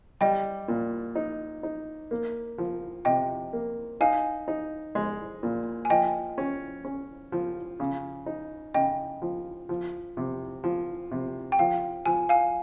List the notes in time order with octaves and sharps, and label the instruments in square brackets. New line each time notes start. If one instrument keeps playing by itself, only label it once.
[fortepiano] G3 [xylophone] D#5 G5
[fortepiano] A#2
D#4
D#4
A#3
F3
[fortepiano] C3 [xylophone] D#5 G5
[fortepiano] A#3
[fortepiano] D#4 [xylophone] F5 G#5
[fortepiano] D#4
G#3
A#2
[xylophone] G#5
[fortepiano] F3 [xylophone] D#5 G5
[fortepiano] C#4
C#4
F3
C#3
D#4
[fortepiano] C#3 [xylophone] D#5 G5
[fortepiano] F3
F3
C3
F3
C3
[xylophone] G5
[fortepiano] F3 [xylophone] F5
[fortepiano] F3 [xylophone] G#5
[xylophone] F5 G#5